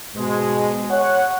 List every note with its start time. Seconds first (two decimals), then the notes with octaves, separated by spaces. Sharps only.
0.16 G#2 B2 G#3
0.91 C#5 F#5